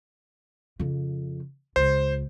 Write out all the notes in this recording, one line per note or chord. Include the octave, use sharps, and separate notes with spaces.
F2 C#3
C#2 C5